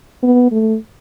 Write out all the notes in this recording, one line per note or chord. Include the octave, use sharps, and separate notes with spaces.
B3
A3